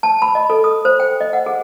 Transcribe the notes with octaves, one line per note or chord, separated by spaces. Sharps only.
A5
B5
D#5
A4
D#6
C5
G5
D#5
F#5
G#4